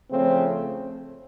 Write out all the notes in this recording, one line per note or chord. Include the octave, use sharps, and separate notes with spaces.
C#3 F3 A3 C4